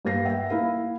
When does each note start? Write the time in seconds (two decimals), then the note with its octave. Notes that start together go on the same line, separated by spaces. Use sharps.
0.05 G2 A#3 A#6 C7
0.25 E5 F#5 G5
0.50 A#3 E4 A#4 F5